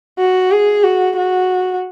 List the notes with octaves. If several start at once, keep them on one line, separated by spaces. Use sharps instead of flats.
F#4
G#4
F#4
F#4